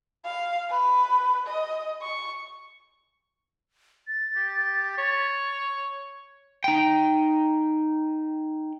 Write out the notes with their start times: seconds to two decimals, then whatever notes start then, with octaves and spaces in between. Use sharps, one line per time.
0.25 F5
0.70 B4
1.47 D#5
2.02 C#6
4.07 A6
4.36 G4
4.97 C#5
6.64 D#4 G5